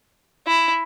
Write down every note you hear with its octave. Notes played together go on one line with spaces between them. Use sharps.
E4